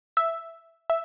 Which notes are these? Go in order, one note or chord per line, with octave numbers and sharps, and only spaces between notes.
E5
E5